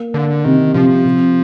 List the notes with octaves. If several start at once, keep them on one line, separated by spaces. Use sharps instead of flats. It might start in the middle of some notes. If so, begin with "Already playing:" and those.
Already playing: A#3
D3 A#3
C3 D#3
C3 F3
C3